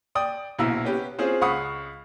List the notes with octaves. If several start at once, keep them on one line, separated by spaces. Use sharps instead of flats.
D5 G5 D#6
A#1 B2 E4 F5 A#5 E6
B3 C#4 G4 B4
C4 C#4 F4 G#4 C5
C#2 F5 F#5 B5 C#6 D#6